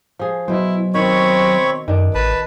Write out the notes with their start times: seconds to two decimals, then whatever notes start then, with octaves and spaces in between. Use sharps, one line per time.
0.19 F3 G#4
0.48 B2 F#3 E4 C5
0.94 D#3 C4 C#5 B5 C#6
1.88 F#2 D#3 D4
2.14 A1 B4 A5